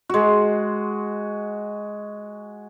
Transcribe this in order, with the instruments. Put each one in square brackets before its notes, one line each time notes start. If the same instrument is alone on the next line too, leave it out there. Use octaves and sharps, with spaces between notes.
[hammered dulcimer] G#3 F#4